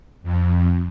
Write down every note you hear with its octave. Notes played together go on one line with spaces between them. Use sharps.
F2